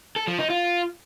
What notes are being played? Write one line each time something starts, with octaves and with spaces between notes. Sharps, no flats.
A4
F3
D#4
F4